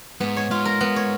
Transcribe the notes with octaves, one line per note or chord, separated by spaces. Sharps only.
G#2 B3
C#5
G#2 F4
A#4
B3
C#5